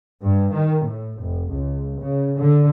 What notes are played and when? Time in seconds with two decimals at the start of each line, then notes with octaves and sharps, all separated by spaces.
0.24 G2
0.53 D#3
0.85 A2
1.20 F1
1.51 C#2
2.01 C#3
2.38 D3